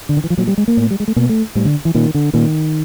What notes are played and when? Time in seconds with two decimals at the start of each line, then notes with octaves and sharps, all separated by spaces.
0.09 D3
0.17 D#3
0.24 E3
0.30 F3
0.37 A#2 F#3
0.47 G3
0.58 G#3
0.68 A#3
0.77 A2
0.91 G3
1.00 G#3
1.08 A3
1.16 B2 A#3
1.29 A3
1.55 A2 G3
1.65 D3
1.85 E3
1.95 A#2 D#3
2.15 D3
2.33 A#2 D#3